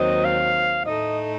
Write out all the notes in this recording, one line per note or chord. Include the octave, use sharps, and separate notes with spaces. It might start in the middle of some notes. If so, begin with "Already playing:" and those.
Already playing: D#2 D#3 F#3 C4 D#5
F5
A2 A3 D#4 D#5